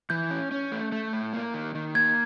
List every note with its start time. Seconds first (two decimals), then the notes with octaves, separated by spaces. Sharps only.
0.10 E3 G6
0.30 C#4
0.52 C#4
0.72 A3
0.92 A3
1.13 A2
1.33 A#3
1.54 D#3
1.75 D#3
1.95 A#3 G#6